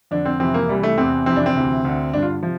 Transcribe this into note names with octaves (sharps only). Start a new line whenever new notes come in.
F2 D3 D4
C4
F2 C3 E3 C4
A#3
C2 C3 E3 G3
A3
E2 C3 E3 C4
F2 C3 E3 C4
D4
C4
D2 C3 E3
D2 D3
G2 D3 D4
F4
C3 F3